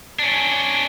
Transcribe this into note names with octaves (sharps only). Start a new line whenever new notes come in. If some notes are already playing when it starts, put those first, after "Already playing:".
C#4 D4